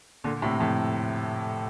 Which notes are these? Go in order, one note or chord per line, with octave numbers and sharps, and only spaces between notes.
A#2 D3
A2 C3
F2 A2